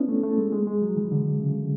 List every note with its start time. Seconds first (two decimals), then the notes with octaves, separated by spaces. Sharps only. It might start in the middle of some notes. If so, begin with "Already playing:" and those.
Already playing: B3 C#4 D4 E4
0.08 A3
0.23 A3
0.38 G#3
0.52 G#3
0.67 G#3
0.82 F#3
0.97 E3
1.12 D3
1.40 C#3